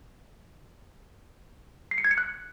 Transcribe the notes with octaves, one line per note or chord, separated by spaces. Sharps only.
C7
C#7
G#6
C#7
F#6